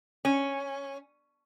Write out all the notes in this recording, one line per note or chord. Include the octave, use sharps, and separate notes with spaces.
C#4